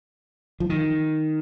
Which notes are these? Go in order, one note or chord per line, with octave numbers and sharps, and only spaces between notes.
F3
D#3